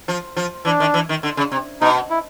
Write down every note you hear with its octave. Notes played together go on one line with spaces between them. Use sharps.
F3
F3
E3 D4
D#3
E3
D#3
D3
C#3
C3
B2 D#4
E4